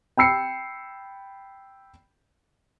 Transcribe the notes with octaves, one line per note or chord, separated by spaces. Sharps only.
G5 B5 E6 C7 C#7